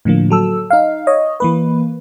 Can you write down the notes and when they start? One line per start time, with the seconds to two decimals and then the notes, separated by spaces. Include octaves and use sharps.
0.05 A2 D3 F3 A#3
0.30 F#3 A4 E6
0.70 D#4 F5
1.07 C#5 D#5
1.40 E3 A#3 B4